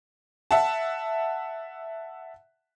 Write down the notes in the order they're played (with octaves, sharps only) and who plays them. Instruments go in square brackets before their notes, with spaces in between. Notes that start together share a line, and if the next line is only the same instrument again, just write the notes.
[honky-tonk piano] E5 F#5 A5